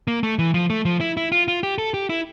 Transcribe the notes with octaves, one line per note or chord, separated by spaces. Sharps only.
A#3
A3
E3
F3
A3
F3
E4
E4
F4
F4
G4
A4
G4
E4